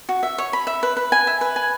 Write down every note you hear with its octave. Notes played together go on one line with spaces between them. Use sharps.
F#4
E5
C#5
B5
E5
B4
B4
G#5
E5
B4
G#5